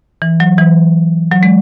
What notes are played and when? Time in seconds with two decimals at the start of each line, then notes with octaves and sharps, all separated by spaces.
0.22 E3
0.40 F#3
0.58 E3
1.32 F#3
1.43 G#3